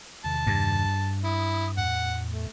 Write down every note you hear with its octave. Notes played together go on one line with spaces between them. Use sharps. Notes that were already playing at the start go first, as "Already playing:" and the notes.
E2 C3 D#3 A5
G2
E4 D#6
E2 A2 F#5
A3